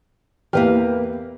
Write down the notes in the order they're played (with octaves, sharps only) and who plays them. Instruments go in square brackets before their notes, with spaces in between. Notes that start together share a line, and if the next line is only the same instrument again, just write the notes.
[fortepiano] E2 G4 F6 [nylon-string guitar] A#3 B4 G5